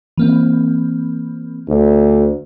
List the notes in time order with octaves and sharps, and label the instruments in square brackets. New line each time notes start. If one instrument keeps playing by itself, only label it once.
[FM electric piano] E3 A#3 C4
[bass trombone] D2